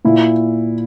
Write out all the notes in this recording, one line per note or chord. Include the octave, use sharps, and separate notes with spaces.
A#2 E4